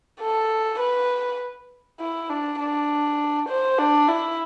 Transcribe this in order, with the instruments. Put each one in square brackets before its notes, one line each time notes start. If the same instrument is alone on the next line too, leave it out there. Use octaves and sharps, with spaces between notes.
[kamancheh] A4
B4
E4
D4
D4
C5
D4
E4